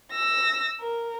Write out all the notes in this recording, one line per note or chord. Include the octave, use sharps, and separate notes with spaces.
E6 A#6
A#4